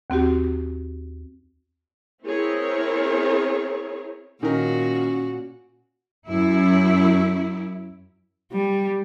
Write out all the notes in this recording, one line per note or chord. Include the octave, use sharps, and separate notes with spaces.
D#2 C4 F#4 G4
C4 E4 G#4 A#4 C#5
A#2 D#3 C#4 F#4 A#4
F#2 E4
G3